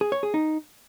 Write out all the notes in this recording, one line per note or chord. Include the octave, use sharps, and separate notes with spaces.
G#4
C#5
G#4
D#4